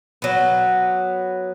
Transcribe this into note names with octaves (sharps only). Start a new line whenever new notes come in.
F#3 B3